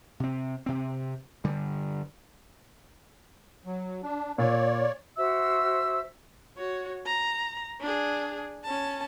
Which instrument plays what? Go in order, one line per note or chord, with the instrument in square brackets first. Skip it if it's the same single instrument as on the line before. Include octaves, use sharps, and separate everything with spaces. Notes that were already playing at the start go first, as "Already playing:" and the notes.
[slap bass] C3 C4
C3 C4
G2 D3 G3
[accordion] F#3
D4
[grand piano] A#2 [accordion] C#5 D5
[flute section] F#4 C5 E5 E6
[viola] F#4 C#5
A#5
D4 G#4
C#4 A5